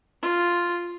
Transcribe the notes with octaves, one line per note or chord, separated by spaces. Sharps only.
F4